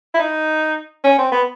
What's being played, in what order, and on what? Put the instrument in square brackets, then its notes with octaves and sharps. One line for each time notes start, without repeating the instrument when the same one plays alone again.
[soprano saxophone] E4
D#4
C#4
C4
B3